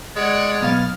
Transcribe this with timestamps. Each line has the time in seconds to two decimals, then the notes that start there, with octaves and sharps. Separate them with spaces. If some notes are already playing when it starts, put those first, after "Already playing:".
0.16 G#3 C#5 D5 F#5
0.61 B1 B3 F5 F6 A6